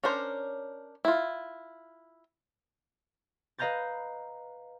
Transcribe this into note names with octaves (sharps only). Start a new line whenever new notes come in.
C#4 D4 A#4 C5
E4 F4
B4 D#5 F5 A#5 G6 A6